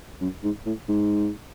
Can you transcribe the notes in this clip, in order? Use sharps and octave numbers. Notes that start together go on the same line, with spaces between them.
F#2
G#2
A2
G#2